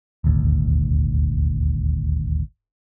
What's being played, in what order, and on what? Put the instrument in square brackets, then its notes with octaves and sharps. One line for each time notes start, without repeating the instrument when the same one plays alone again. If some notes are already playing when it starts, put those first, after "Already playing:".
[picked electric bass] D#1 G#1 D2